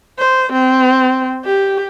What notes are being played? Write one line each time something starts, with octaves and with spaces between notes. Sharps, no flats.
C5
C4
G4